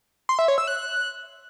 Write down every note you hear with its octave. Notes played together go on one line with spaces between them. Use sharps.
C6
E5
C#5
E6
F#6